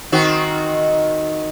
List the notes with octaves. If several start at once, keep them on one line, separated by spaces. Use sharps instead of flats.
D#3 C4 F#4